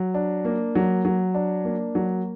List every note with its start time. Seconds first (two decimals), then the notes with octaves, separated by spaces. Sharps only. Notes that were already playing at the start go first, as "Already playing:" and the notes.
Already playing: F#3
0.14 D4
0.45 A#3
0.75 F#3
1.05 F#3
1.35 D4
1.65 A#3
1.95 F#3